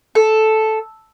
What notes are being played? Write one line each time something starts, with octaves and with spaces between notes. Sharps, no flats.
A4